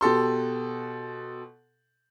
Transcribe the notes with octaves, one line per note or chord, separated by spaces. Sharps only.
B2 G4 A4 C6